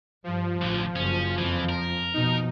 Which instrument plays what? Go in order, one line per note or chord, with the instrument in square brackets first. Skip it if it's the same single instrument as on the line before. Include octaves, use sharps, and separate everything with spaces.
[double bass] G2 [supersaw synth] F3
[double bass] A1 [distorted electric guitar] D2 D3
[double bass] F#1 [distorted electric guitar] C#4
[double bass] F2 [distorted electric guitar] E3
[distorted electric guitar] A#4
[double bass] B2 F3 [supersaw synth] D#4